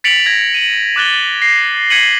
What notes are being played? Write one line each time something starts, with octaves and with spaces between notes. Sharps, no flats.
A6 B6 C#7 D7 F7 F#7
G#6 A#6
D#7 F#7
D6 F#6 A6 G7
A#6 C7
G#6 B6 C#7 D#7 F#7